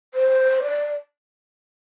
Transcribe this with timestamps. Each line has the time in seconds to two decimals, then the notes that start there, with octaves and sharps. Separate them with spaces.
0.14 C5
0.63 D5